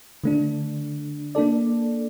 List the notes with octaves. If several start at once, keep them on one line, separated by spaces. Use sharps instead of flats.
D3 A3 D4
A#3 D4 A4 D5